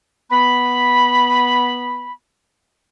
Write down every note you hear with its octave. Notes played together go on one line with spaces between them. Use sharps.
B3 B5